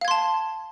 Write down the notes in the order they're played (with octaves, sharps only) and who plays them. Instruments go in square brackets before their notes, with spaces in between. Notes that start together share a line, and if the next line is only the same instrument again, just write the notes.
[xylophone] F5
G#6
C6
A5